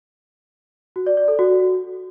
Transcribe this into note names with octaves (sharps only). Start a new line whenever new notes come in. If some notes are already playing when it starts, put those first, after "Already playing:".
F#4
D5
D5
A4
F#4